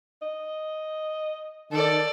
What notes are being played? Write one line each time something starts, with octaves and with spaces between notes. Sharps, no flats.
D#5
D#3 A4 D5